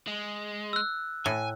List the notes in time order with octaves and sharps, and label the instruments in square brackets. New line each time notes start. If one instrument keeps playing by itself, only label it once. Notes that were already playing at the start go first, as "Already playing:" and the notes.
[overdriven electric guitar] G#3
[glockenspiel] E6 F#6
[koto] A2 [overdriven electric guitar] G#5